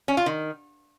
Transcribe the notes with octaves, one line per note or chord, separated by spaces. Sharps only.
C#4
F4
D#3